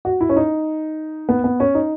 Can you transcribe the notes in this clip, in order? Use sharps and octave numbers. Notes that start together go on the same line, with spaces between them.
F#4
E4
C#4
D#4
B3
B3
C#4
D#4